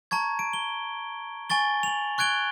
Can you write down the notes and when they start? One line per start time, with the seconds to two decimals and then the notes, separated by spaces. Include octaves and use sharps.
0.11 A5 A#5 C#6 G#6
0.39 D7
0.53 G7
1.50 G#5 C#6 A6 G7
1.83 F7 F#7
2.18 C#6 F#6 G#6 D7 G7